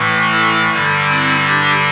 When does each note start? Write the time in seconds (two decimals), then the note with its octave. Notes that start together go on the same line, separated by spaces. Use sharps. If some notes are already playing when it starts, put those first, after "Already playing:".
Already playing: A2 E3 A3
0.31 E4 A4
0.71 G2 D3 G3
1.08 C4 E4
1.46 D4 G4